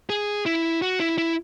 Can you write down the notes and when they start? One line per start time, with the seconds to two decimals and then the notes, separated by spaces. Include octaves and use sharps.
0.10 G#4
0.46 E4
0.82 F#4
1.00 E4
1.18 E4